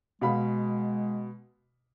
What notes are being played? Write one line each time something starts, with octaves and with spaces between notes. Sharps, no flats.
B2 G#3 F5 B5